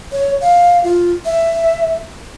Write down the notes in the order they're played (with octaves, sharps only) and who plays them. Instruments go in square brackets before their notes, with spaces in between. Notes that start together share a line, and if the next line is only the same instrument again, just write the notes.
[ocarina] C#5
F5
F4
E5